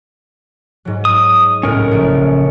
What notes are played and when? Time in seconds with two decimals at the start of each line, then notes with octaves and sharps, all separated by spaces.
0.85 G#2 F#3
1.05 D#6
1.63 C#2 A2 C#4 A#4
1.91 A#1 C#3